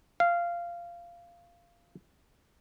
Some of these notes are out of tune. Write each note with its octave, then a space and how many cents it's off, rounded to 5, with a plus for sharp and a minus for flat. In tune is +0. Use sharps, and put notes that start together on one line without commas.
F5 -15